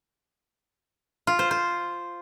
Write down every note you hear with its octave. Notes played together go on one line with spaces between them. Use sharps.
F4
C5
C5